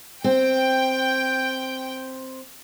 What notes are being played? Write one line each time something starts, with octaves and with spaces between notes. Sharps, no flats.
C4 G5